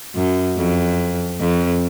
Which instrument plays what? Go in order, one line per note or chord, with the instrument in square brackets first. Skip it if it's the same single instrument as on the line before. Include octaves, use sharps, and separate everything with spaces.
[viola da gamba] F#2
F2
F2